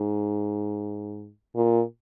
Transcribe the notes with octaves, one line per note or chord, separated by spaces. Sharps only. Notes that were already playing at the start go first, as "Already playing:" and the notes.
Already playing: G#2
A#2